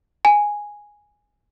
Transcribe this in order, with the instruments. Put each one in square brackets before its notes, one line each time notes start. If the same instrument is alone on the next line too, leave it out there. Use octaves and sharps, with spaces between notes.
[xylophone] G#5